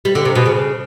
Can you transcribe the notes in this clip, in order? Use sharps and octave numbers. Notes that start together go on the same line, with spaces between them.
G3
D3
C3
B2
C#3